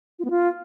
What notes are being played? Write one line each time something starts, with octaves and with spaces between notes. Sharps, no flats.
F4
B3
F4